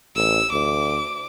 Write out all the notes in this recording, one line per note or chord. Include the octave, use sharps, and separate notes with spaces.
A1 E6
D2 D6